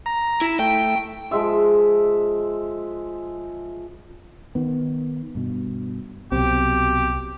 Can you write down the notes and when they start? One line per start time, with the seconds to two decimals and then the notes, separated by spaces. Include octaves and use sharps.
0.06 A#5
0.41 E4
0.59 A3 G5
1.31 F3 G#3 E5
4.55 D#3 B3
5.35 G2 B2
6.32 C2 B2 F#3 C4 G4